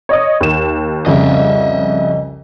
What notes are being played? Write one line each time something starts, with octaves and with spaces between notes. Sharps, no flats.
C#5 D#5 D#6
D#2 E7
C2 F2 C#3 D#5 E5